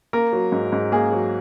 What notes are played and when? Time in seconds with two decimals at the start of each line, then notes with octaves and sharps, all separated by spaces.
0.13 A#3 A#4
0.33 F#3
0.52 G#2
0.72 G#2
0.92 A#3 G#4
1.12 F#3